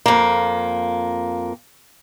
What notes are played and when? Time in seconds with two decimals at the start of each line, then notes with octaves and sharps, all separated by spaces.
0.06 F2 A#3